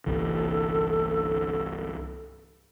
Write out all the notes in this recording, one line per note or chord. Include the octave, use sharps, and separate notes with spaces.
G1 C2 E3 A4